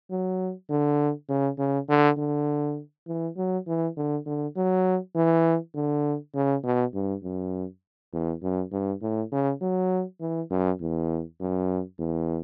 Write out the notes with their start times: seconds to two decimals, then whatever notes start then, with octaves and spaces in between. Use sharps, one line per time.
0.10 F#3
0.70 D3
1.28 C#3
1.58 C#3
1.89 D3
2.17 D3
3.08 E3
3.37 F#3
3.67 E3
3.97 D3
4.26 D3
4.56 F#3
5.15 E3
5.75 D3
6.35 C#3
6.64 B2
6.94 G2
7.23 F#2
8.13 E2
8.42 F#2
8.72 G2
9.02 A2
9.32 C#3
9.61 F#3
10.21 E3
10.51 F#2
10.80 E2
11.40 F#2
11.99 E2